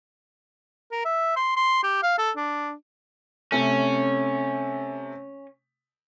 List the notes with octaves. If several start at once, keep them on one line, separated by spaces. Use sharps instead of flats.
A#4
E5
C6
C6
G4
F5
A4
D4
C3 A3 C#4